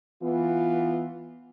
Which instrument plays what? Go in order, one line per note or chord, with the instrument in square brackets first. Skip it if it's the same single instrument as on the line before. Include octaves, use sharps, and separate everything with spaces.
[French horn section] E3 B3 F4